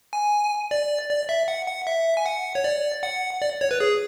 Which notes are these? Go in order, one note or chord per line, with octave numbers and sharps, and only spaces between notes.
G#5
D5
D5
E5
F#5
F#5
E5
G#5
F#5
C#5
D5
F#5
D5
C#5
B4
G#4